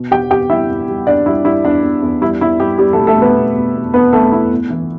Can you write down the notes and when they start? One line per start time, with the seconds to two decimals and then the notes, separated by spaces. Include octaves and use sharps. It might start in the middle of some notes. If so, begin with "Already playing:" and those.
Already playing: B2
0.11 E2 G4 G5
0.30 E2 G4 G5
0.50 G3 E4 E5
0.69 E2
0.88 G3
1.07 E2 D4 D5
1.26 G3 E4
1.45 G3 E4
1.64 E2 D4
1.83 E2
2.02 E2
2.21 G3 E4
2.41 E2 E4
2.60 E2 G3 G4
2.78 E2 G3 G4
2.93 A3 A4
2.99 B2
3.07 A3 A4
3.17 B2 B3 B4
3.36 B2
3.55 B2
3.74 E2
3.94 E2 B3 B4
4.13 E2 A3 A4
4.32 E2 E4
4.51 E2
4.70 E3